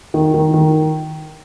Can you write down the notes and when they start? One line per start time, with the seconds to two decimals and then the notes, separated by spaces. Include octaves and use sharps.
0.14 D#3
0.34 D#3
0.54 D#3